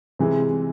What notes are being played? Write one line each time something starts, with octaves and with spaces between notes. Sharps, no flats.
C3 E3 G#3